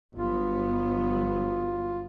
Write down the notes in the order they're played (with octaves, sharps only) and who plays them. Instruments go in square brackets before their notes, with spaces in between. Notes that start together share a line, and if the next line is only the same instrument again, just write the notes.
[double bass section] G1 F#3 B3 [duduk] F4